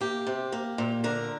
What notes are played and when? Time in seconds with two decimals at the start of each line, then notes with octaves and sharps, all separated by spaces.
0.01 A#3 G4
0.27 C3
0.52 A#3
0.78 A#2
1.04 D3 A#4